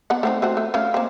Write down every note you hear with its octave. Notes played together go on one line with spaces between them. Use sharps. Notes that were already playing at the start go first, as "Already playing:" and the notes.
B3 F#5
A3 C4 D#4
A3 C4 F#4
A3
A3 C#4 F5
A#3 C4